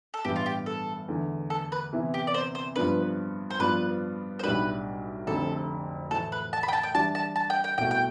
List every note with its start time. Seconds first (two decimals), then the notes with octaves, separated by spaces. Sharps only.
0.14 A4
0.24 A1 G2 E3 B3 G4
0.36 F4
0.46 G4
0.66 A4
1.08 E2 D3 A3
1.50 A4
1.72 B4
1.93 C3 E3 B3 E4
2.14 G4
2.27 D5
2.34 C5
2.55 C5
2.76 G2 F3 B3 D4 B4
3.50 C5
3.59 G2 F3 B3 D4 F4 B4
4.39 C5
4.43 B1 A2 G3 D4 B4
5.27 F1 F2 D3 A4
6.11 A2 E3 A3 A4
6.32 B4
6.53 A5
6.63 B5
6.68 G5
6.73 A5
6.83 G5
6.95 E3 G3 D4 A5
7.15 A5
7.36 A5
7.50 G5
7.64 G5
7.78 C2 B2 A3 G5
7.91 G5